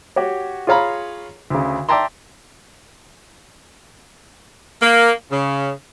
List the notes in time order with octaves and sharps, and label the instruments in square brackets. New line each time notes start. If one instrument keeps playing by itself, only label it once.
[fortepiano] F#4 G4 C#5
F4 G#4 C#5 F5 A#5 B5
D2 C#3
D5 E5 G5 A5 A#5 C6
[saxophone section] A#3
C#3